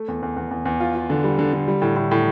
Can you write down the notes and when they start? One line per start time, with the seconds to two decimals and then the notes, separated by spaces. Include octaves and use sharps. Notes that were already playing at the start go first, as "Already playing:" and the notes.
Already playing: A3
0.08 E2
0.23 E2
0.36 E2
0.51 E2
0.65 E2
0.80 F4
0.95 F4
1.10 D3
1.24 G3
1.39 D3
1.53 D3
1.68 G3
1.82 A2
1.96 A2
2.11 A2